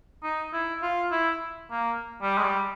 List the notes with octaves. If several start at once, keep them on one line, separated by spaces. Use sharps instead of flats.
D#4
E4
F4
E4
A#3
G3
G#3
G3